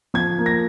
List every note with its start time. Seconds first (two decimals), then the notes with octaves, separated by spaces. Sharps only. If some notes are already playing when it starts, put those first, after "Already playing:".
0.14 F3 G#6
0.38 A#3
0.46 A#6